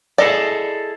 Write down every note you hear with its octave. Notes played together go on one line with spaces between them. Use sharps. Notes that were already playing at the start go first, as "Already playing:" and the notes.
E4 G#4 A4 D5 D#5